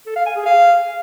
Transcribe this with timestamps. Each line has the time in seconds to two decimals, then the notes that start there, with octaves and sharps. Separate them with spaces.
0.06 A4
0.16 F5
0.26 G#5
0.36 G#4
0.46 F5